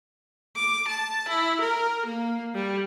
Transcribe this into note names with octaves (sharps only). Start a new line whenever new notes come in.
D6
A5
E4
A#4
A#3
G3